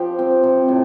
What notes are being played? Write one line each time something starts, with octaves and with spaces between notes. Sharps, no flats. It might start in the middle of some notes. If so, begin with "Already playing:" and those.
Already playing: F3 G4
C4
C3
A2